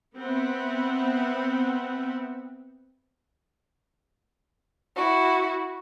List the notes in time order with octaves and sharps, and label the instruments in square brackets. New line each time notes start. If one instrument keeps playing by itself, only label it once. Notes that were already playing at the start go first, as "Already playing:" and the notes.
[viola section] B3 C4 B4 E5 F#5
[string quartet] E4 F#4